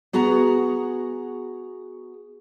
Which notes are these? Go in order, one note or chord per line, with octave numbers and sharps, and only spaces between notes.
B3 F#4 G#4 F#5 A#5